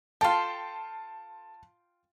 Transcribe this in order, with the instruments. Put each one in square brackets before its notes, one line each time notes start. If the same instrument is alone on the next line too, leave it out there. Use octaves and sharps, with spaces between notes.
[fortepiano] F4 F5 G5 [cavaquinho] A4 C6 [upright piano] A5